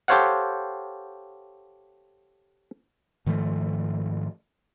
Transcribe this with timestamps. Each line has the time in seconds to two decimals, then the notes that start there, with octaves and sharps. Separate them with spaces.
0.08 G4 A4 C5 C#5 F5 F#5
3.26 G#2 D#3 F3 A3